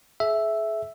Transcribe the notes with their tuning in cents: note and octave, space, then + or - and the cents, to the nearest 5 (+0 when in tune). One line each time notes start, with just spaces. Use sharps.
G#4 +40 E5 +0